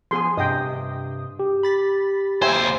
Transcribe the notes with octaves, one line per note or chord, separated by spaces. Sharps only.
F3 B3 G#4 G#5 C6
G2 C3 D#5 G5 D#6
G4
B5 A6 B6
D#2 C5 E5 G5 G#5